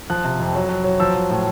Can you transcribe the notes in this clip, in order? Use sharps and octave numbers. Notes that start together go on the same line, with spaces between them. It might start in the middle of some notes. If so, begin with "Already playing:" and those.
F3 F#6
C3
F2
F#3
F#3
F#3
F3 E6
F3
A2